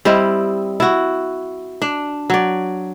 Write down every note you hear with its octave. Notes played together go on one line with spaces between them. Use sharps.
G3 C4 E4 D#5
E4 F#4
D4
F#3 D5